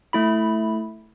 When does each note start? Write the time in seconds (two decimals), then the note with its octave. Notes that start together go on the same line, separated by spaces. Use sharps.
0.13 A3 E4 B5